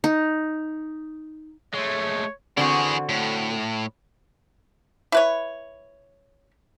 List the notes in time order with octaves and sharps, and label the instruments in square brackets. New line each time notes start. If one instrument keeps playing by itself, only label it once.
[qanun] D#4
[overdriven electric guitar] G#3 A3 [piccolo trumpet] C#5
[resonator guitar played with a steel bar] D3 C4 F#4 [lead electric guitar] E3 G#4
[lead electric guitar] A2
[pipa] E4 B4 C#5